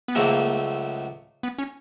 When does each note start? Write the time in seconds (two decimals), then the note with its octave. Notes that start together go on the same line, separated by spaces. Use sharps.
0.08 B3
0.15 C#2 C#3 F#3 A3 A#3 C4
1.43 B3
1.58 C#4